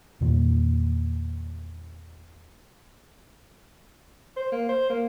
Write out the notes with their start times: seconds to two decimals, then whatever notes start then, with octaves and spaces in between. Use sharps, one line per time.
0.21 E2 A#2 D#3 A#3
4.37 C5
4.52 A#3
4.69 C5
4.90 A#3